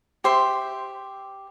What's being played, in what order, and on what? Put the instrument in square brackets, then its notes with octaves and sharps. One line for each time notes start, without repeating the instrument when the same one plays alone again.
[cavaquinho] G4 C5 E5 C6